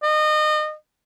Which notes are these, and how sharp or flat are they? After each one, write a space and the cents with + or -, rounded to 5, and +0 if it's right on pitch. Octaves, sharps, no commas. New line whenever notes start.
D#5 -30